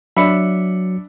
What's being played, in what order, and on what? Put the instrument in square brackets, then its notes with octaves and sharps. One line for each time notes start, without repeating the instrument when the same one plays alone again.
[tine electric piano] F#3 C#7 [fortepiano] D4 E5 B5